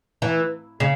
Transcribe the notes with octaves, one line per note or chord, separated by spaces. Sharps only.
E3
C#3